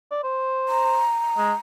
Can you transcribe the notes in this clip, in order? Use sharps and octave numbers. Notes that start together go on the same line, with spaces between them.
D5
C5
A#5
G#3